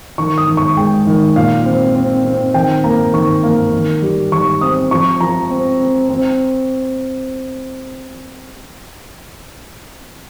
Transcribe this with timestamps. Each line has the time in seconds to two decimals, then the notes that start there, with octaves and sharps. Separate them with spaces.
0.18 D#3 C#6
0.38 D#6
0.48 D#3
0.57 C#6
0.77 G#3 G5
1.07 D#3
1.36 A#2 F5
1.66 C4
1.95 C4
2.25 C4
2.54 D#3 G5
2.84 A#3 A#5
3.14 D#3 C#6
3.43 A#3
3.73 D#3
4.02 G3
4.32 D#3 C#6
4.61 C4 D#6
4.91 F3 C#6
5.21 F3 A#5
5.50 C4
5.80 C4
6.09 C4